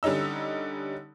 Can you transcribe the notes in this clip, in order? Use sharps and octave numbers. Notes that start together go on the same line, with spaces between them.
D3 G3 C#4 D#4 E6